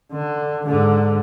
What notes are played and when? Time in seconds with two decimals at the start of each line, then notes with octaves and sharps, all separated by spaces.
0.12 D3
0.66 G#2 D3